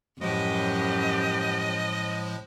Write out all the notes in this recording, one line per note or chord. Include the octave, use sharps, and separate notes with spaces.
F#2 A2 F3 G#3 B3 C#4 G4 D#5